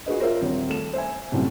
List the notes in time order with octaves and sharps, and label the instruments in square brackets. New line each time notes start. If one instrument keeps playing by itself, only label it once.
[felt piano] F#4 G#4 B4 D#5
F4 A#4 C5 C#5 E5
D#1 C4
A3 E7
C5 E5 G#5
F#2 A2 C3 F#3 G3